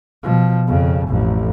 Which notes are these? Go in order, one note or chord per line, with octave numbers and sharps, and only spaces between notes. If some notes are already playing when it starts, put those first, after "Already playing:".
B2 F3
F2 C#3
A1 F2